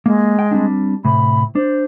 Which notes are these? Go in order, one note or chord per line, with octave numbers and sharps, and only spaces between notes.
G#3 A#3
G5
G3 C4 D4
A2 C3 B5
D4 C5